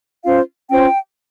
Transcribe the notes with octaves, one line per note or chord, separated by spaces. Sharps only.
C#4 F4 C5 F5
C#4 F4 C5 G5